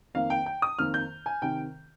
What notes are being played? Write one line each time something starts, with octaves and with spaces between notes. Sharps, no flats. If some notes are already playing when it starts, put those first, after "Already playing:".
F2 D#3 A#3 F5
G5
G5
D#6
F2 D#3 A#3 F6
G6
G#5
C3 D#3 G5